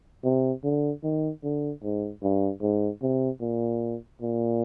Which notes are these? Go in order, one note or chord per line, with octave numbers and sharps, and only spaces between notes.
C3
D3
D#3
D3
G#2
G2
G#2
C3
A#2
A#2